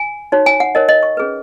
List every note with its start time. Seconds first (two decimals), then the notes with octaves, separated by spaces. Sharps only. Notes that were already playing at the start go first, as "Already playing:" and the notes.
Already playing: G#5
0.32 D#4 F#4 C#5
0.46 G#5
0.60 F#5
0.75 D#4 A#4 C#5 D#5
0.89 D#5
1.03 C#6
1.17 C#4 G#4 B4